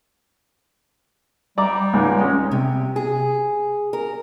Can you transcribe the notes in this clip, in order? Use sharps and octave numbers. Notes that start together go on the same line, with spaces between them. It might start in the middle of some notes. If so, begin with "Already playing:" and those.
G3 D5 A#5 D6
C#2 G#2
G#3 C#4
C3
G#4
A#4